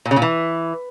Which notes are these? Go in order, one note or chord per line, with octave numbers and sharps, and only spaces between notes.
A#2
C#3
A#2
E3